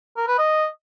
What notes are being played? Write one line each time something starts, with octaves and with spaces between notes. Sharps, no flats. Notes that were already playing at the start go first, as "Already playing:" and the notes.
A#4
B4
D#5